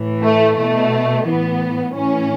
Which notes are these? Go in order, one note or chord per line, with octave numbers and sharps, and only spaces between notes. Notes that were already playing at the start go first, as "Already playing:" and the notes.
Already playing: A2 E3
A3
B2 A3
A2 E3 B3
A2 E3 C#4